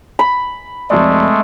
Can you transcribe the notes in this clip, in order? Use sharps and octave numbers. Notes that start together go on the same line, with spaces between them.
B5
F1 G#3 A3 D5